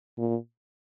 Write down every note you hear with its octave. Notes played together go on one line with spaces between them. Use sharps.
A#2